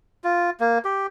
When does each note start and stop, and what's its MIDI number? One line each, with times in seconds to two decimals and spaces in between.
0.24 0.50 65
0.60 0.78 58
0.85 1.07 67